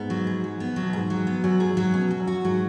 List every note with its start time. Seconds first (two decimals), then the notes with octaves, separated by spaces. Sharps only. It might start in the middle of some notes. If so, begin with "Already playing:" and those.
Already playing: G#2 B3
0.10 F#3
0.27 G#4
0.44 F#3
0.60 B3
0.76 F#3
0.82 B2
0.93 G#2 G#4
1.10 F#3
1.27 B3
1.44 F#2 F#3
1.59 F#2 G#4
1.69 G#2
1.77 F#3
1.94 B2 C#4
2.11 F#3
2.19 F#2
2.27 F#4
2.44 G#2 F#3